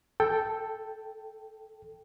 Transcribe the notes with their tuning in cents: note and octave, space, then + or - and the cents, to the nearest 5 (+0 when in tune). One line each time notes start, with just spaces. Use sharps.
A4 +0 G5 +0